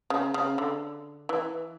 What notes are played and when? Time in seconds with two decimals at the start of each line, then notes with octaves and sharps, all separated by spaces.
0.10 C#3
0.34 C#3
0.58 D3
1.29 E3